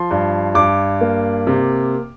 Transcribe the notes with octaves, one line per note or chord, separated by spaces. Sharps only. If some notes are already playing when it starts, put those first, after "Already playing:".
Already playing: F3 C6
G2
G2 D6
A#3
C3